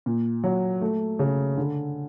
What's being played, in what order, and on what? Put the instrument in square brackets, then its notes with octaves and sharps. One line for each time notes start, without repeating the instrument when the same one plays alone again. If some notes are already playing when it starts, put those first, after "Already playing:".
[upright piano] A#2
F#3
A3
C#3
D3